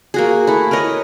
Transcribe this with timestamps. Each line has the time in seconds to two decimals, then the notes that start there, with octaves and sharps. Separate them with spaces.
0.14 A#3 F#4 G#4
0.47 A3 E4
0.71 A#4 B4 C#5 D#5